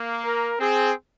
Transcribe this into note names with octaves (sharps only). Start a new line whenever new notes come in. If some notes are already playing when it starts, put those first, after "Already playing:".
Already playing: A#3
A#4
C4 G#4